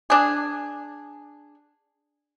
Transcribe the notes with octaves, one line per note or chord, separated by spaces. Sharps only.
D4 G#4